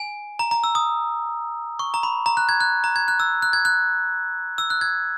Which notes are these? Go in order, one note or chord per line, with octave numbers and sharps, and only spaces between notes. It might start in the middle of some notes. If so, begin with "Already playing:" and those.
Already playing: G#5
A#5
A#5
E6
D#6
C#6
A#5
B5
A#5
F#6
G#6
F#6
A#5
G#6
F#6
E6
F#6
G#6
F#6
E6
F#6
G#6